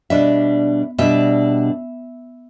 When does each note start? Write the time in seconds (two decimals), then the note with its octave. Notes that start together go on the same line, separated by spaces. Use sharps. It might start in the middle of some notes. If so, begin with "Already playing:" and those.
0.10 B2 G3 D4 E5
0.98 B2 G3 D4 E5